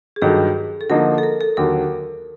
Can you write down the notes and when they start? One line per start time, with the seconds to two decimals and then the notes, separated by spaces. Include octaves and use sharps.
0.16 G#4
0.22 G2 D#3 F#3 A4
0.81 A4
0.90 D3 F3 A#3 D#4 A#4
1.18 A4
1.23 A#4
1.41 A4
1.57 D#2 D3 F#3 A#4